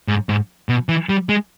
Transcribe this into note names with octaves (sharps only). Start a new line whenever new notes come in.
G#2
G#2
B2
E3
G3
G#3